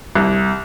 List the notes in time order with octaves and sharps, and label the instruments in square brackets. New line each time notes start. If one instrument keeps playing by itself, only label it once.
[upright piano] C2